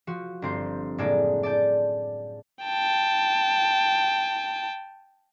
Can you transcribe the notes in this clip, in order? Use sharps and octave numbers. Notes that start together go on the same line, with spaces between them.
F3 F#4
G1 C4 C5
F#1 A2 G#3 A#3 A4 D5
D5 A5 G6
G5 A5